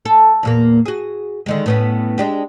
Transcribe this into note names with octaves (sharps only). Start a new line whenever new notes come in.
A4
E2 A#2 A#3
F#4 G#4
D3 D#3 G#3
A2 B3 C#4
G#3 D4 G4